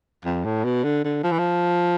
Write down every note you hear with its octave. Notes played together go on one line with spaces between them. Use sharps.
F2
A2
B2
D3
D3
F3
E3
F3